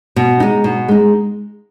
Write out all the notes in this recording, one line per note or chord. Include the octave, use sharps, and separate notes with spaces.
B2
G#3 D#4
B2
G#3 D#4